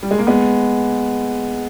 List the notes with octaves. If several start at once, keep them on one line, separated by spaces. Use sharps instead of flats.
G3
G#3
A#3
G#3 B3